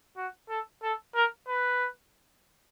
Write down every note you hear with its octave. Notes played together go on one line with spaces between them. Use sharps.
F#4
A4
A4
A#4
B4